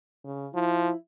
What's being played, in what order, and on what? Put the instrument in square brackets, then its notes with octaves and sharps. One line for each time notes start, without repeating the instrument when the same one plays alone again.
[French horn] C#3
[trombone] F3 [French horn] E4